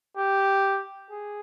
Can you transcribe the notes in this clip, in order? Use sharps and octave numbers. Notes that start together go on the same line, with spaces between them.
G4
G#4